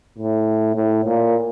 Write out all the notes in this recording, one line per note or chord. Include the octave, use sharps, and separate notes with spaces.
A2
A2
A#2